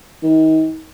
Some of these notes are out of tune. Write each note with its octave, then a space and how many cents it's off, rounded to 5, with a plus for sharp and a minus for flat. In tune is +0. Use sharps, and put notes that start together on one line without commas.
D#3 +30